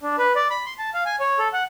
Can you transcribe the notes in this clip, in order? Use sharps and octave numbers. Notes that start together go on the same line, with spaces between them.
D4
B4
D5
B5
C6
A5
F5
G#5
C#5
A4
F#5